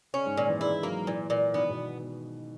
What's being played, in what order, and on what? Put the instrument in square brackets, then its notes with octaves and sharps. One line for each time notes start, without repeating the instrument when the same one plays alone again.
[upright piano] C#3 [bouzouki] C#4
[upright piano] G#2
[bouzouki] A#2 [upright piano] D#3
[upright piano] E3
[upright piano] G#3 [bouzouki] E4
[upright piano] F#3 [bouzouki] A#3
[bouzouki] A#2 [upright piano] E3
[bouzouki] A#2
[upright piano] D#3 [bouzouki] B3
[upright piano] B2